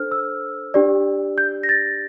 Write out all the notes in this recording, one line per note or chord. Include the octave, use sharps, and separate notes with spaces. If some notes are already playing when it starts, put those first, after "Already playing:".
Already playing: D4 A4 C5 F6
E6
D4 G4 D5
G6
A#6
A6